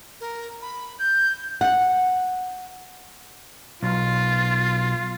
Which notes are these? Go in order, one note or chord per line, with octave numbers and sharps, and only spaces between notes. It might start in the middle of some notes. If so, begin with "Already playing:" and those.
A#4
B5
G6
F#5
B1 F4